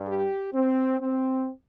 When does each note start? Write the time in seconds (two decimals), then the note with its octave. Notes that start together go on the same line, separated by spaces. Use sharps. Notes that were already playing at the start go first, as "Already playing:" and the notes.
Already playing: G2 G3
0.08 G4
0.54 C4
1.01 C4